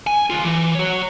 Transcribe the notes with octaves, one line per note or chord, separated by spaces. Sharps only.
G#5
D2 F4
E3
F#4 C#5